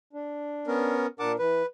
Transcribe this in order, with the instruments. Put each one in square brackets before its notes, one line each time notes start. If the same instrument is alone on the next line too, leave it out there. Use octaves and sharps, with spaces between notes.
[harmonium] D4
[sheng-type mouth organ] B3 C#4 A#4
[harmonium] A#2 D4 A#4 [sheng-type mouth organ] F#5 A5 D6
[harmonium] E3 [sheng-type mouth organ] B4